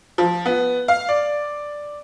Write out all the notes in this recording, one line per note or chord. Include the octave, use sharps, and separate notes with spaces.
F3
B3
F5
D5